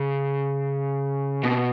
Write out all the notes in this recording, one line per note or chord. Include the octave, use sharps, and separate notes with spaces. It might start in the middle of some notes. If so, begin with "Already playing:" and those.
Already playing: C#3
B2